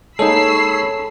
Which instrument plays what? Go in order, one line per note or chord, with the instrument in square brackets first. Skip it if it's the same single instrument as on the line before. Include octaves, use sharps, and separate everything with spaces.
[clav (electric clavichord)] G#3 A#3 D#4 [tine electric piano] A4 [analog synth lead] C#5 [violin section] B5 E6 C7